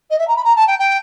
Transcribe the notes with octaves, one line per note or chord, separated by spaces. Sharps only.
D#5
E5
A#5
B5
A#5
A5
G5
G5